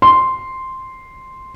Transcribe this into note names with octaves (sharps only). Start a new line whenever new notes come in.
C6